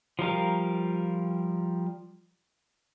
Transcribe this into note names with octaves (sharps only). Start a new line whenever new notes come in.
F3 G3 A#4 F5